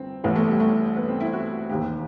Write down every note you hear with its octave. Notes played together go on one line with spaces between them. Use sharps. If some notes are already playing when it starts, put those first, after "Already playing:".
Already playing: G1 C4
A1 A2 E3 B3
A3
G3
A3
B3
C4
E4
F#4
E1 D#2 D#3 G4